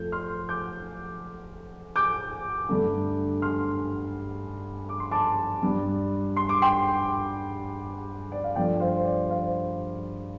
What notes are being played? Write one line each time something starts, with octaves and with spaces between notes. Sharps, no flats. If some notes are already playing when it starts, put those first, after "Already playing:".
Already playing: F2 F3 A3 G6
C6 F6
D6 G6
D6 G6
G2 D3 A3
C6 F6
D6
C6
A5 D6
G2 G3
C6
D6
G5 C6
D5
F5
G2 F3 A3 D5 G5
C5 F5
D5
C5 F5